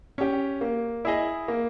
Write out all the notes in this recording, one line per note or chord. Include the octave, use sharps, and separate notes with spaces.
C#4 G4
A#3
E4 G#4 D#5
A#3